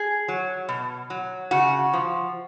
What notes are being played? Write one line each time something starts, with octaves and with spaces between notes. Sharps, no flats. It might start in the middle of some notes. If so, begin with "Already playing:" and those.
Already playing: G#4
F#3
B2
F#3
C#3 F#4
F3